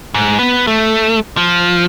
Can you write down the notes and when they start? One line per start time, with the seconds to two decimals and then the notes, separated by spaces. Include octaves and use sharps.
0.14 G#2
0.39 B3
0.67 A3
1.37 F3